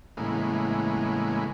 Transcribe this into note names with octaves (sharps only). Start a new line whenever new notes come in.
A2 C#3 E3 G#3 A#3 B3